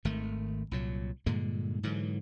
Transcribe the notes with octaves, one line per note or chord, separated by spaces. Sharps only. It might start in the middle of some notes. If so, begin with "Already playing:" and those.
G#1 D#3 A3
C2 A#2 F#3
G2 A#2 D3 G#3
G#2 D3 E3 F#3